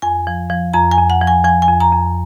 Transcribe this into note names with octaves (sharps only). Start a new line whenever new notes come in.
F2 G#5
F3
F3
F2 A#5
G#5
F2
F#5
F3
G#5
F3 G#5
G#5
F2
A#5
F2